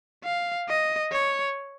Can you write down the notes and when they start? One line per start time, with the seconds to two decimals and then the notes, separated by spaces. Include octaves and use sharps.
0.24 F5
0.68 D#5
1.12 C#5